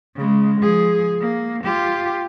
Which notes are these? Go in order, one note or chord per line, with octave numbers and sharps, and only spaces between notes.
C#3 G#3
F3 G#4
A#3
F4 G4